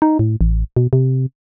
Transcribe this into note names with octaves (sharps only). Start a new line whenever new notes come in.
D#4
A2
A1
B2
C3